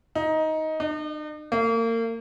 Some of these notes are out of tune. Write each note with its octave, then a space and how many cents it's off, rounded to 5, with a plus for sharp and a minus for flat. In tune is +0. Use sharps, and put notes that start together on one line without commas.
D#4 +15
D#4 -45
A#3 -35